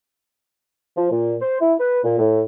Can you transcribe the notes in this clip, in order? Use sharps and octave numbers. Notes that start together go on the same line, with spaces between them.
F3
A#2
C5
E4
B4
A#2
A2